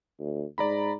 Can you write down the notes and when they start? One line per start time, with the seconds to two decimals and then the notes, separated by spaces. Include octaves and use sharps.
0.19 D2
0.58 G#2 D5 A#5 B5